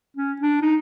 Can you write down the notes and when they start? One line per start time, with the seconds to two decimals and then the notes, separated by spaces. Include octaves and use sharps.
0.17 C#4
0.42 D4
0.62 D#4